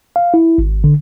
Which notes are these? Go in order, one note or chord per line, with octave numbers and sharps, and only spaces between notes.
F5
E4
G#1
D3